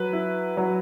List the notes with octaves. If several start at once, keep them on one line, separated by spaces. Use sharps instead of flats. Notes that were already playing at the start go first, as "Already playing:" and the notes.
Already playing: F#3 B4
E4
F#3